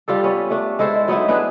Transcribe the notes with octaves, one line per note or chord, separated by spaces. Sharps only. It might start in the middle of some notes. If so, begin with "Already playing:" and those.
G3 F4 G4 A4
B3 C#4
A3 D4
G#3 E4 A4 C5
F#3 B3 D#4 E4
B3 D4 G#4 B4